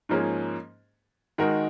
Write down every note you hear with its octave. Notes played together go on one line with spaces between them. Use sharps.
G#2 F3 A#3 C#4 G#4
D#3 G#3 D#4 F#4 A#4